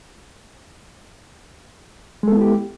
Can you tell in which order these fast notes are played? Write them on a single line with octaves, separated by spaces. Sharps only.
G#3 A4 B3 E4 G4